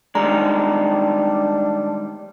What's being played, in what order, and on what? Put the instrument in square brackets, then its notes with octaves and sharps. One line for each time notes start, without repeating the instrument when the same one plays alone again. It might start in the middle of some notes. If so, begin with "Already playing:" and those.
[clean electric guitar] D#3 G3 G#3 [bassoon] D4 [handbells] A#5